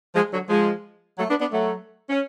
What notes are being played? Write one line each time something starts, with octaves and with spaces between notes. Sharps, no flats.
F3 G#3
D3 F#3
F3 G#3
F#3 A3
B3 D4
B3 D4
F#3 A3
C#4